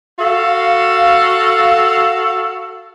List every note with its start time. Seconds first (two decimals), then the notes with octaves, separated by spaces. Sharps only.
0.19 F#4 A4 F5